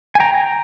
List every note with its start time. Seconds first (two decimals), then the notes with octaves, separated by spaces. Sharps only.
0.15 G#5
0.20 G5 A#5
0.34 G5 A#5